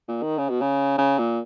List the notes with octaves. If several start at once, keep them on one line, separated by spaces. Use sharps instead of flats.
A#2
D#3
C#3
B2
C#3
C#3
A#2